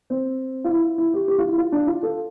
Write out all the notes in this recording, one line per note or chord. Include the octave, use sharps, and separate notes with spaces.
C4
F4
E4
E4
G4
G4
F4
E4
F4
D4
F4
A4